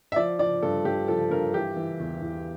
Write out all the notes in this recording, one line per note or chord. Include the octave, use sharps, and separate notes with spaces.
E5
F3 D5
F3 D5
G2 A4
G2 G4
F3 A4
G2 A#4
E3 G4
E3
E2
E2